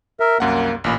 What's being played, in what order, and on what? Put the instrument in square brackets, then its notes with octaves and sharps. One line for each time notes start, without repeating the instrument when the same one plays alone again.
[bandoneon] A#4 E5
[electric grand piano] C2 F#2 F#5 [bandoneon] A#3
[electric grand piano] A1 A#2 B5